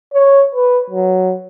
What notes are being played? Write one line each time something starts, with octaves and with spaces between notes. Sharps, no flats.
C#5
B4
F#3